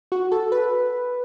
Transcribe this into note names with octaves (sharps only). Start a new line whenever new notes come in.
F#4
A4
B4